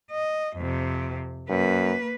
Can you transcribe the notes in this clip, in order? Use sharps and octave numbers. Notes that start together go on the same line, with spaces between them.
D#5
F2 C3
F#2 A#3 B4